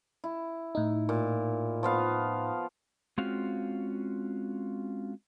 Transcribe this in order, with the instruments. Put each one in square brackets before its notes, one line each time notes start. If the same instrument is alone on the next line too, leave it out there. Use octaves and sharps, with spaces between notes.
[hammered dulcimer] E4
[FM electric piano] A2 D#4
[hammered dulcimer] A#2
F3 B3 F5
[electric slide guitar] G#3 C4 C#4 F4 F#4 F5